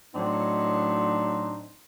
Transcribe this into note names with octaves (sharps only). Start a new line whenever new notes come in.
A2 F#3 C4 D4 D#4